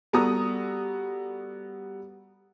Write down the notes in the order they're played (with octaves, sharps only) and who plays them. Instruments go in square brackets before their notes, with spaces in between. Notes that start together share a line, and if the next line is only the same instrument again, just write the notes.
[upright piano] G3 B3 F#4 A4 A#5 D#6